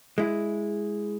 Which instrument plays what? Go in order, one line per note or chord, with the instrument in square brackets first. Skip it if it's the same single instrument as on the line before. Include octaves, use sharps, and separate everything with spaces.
[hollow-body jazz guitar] G#3 E4